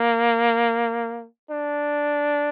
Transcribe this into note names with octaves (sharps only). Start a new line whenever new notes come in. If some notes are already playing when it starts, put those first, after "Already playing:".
Already playing: A#3
D4